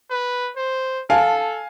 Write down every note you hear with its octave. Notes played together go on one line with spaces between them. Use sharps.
B4
C5
A4 F5 G#5 A5